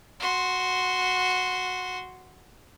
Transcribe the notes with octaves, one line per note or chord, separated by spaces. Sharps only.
F#4 C6